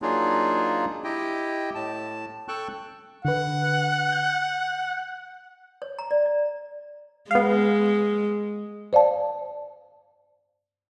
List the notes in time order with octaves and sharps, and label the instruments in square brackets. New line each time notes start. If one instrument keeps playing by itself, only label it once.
[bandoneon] F#3 A#3 D4 D#4 F4 G#4
E4 G4 D#5 G5
A2 A5
A4 G5 A5 C#6 F#6
[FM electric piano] D3 B4 [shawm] F#5
[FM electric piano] G6
[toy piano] C#5
A#5
D5
D5
[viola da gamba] G#3 [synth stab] B3 F5
[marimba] C5 D5 F5 A5